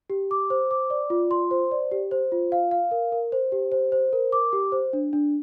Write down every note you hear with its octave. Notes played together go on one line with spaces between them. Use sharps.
G4
D6
C5
D6
D5
F4
C6
C5
D5
G4
C5
F4
F5
F5
A#4
A#4
C5
G4
C5
C5
A#4
D6
G4
C5
D4
D4